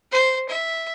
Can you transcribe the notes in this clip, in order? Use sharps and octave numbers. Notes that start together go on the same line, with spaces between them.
C5
E5